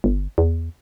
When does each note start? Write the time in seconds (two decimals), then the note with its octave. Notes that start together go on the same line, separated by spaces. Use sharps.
0.04 G1
0.38 E2